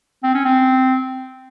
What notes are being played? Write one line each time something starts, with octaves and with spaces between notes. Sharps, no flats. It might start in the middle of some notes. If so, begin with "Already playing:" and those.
C4
C#4
C4